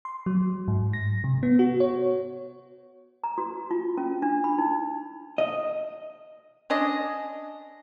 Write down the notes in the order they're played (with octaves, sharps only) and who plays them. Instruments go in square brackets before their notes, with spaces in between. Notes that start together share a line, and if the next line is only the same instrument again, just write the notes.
[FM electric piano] C6
F#3
G#2
A#6
C3
B3
F#4
C#5
[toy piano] A#5
F#4
F4
C#4
D4
B5
D#4
[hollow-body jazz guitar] D#5
[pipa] C#4 D4 D#5